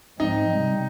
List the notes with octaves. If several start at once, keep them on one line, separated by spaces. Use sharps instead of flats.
G#2 F3 G#3 C4 D#4
C3 G3 C4